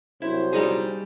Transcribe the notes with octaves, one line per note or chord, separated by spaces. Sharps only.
C2 F#3 E4 C5
G3 D#4 G#4